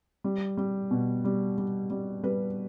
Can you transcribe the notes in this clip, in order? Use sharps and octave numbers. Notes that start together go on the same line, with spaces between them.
G3
G3
B2
G3
G3
G3
G3 B4